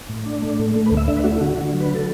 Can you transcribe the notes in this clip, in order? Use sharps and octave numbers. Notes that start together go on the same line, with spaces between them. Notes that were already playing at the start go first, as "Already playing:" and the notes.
A2
D4
A3
A2
A3
B4
D2
E5
D4 E5
B4
A3 F#4
E4
D3 F#4
D3
F#3
B4
A4